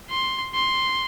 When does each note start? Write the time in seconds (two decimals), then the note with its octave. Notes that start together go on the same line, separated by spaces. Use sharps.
0.10 C6
0.55 C6